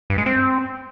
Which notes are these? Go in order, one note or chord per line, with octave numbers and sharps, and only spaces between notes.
G2
G#3
C4